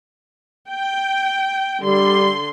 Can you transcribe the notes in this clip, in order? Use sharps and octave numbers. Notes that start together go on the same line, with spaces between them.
G5
D3 G3 C6